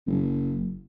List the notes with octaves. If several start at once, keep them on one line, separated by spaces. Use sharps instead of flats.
F#1